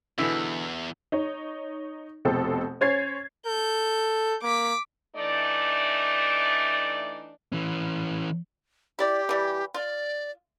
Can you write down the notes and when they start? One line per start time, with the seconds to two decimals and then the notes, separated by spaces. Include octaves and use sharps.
0.18 E2 B2 D3 E3 E4
1.12 D#4 C#5
2.25 F1 B2 C4 A4
2.81 C#4 C5 C#5 G#6 A6 C7
3.47 A4 G6
4.43 A#3 D6 B6
5.16 E3 A3 D4 D#4 D5
7.52 E3 C#4
8.99 E4 G4 D5
9.29 E3 G3
9.74 F4 D5